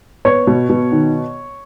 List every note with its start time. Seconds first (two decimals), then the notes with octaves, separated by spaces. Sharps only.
0.25 B3 C#5
0.47 B2
0.69 B2
0.92 D#3